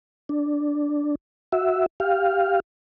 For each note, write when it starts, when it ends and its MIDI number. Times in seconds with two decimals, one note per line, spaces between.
0.29 1.15 62
1.52 1.86 66
1.52 1.86 76
2.00 2.60 67
2.00 2.60 77